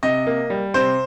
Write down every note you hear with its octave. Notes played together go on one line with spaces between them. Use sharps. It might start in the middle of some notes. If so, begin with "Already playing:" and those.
C3 D#5
A#3
G3
C3 C5